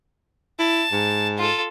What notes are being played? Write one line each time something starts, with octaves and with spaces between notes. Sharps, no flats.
E4 A5
G#2
F4 A4